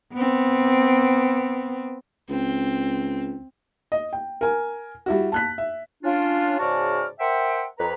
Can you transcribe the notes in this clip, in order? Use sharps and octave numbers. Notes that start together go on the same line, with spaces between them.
B3 C4
C#2 C4
D#5
G5
A#4 G#5
G3 E4 F#4
A5 F#6 B6
E5
C#4 D4 F4
G#2 C#3 F#4 D5 A5 F6
A#4 C5 E5 F#5 G5
F2 B4 A#5